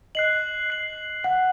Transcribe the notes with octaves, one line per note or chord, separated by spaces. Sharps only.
D#5 F#6 C7 F#7
F#6 C7 F#7
F#5 F#6 C7 F#7